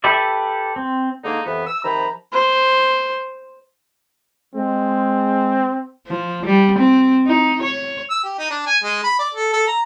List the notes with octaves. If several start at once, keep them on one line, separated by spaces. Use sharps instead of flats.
G4 A4 B4 D5 E5
C4
D3 G#3 A#3 D#4
F2 C3 E3 B3 E5
E6
C3 D#3 F3 A#5 B5
C5
G#3 C4
F3
G3
C4
D#4
C#5
E6
G4
D#4
D4
G#5
G#3
B5
D5
A4
A4
A#5